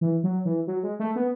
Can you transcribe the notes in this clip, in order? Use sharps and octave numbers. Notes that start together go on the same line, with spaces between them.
E3
F#3
E3
F#3
G#3
A3
B3